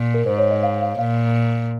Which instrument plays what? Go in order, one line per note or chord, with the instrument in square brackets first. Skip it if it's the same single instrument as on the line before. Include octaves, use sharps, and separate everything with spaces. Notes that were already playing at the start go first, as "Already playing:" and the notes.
Already playing: [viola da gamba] A#2
[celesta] A#4
[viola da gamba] G#2 [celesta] C5
[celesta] C#5
D#5
F5
F5
[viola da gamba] A#2 [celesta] F5